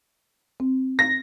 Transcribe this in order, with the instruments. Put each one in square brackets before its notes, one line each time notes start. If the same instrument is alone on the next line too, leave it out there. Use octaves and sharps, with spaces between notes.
[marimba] C4
[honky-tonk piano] A#6